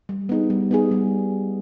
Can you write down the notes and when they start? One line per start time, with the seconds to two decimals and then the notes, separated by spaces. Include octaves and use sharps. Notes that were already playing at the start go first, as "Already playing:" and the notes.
0.09 G3
0.29 B3 D#4 G#4
0.50 G3
0.71 B3 D#4 G#4
0.91 G3